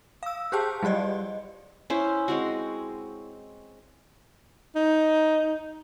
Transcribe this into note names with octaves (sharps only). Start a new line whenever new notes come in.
F5 E6
G4 G#4 C5 G5 A5
F#3 G3 G4 D5 D#5
C#4 E4 C5
G#3 C4 F#4
D#4